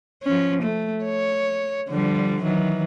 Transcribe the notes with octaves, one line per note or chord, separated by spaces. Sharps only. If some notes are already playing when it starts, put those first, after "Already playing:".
F3 C#4
A3
C#5
D3 F3 G3
D#3 E3 F#3